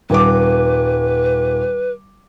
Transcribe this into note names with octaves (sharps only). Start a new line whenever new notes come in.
D#1 B4 D6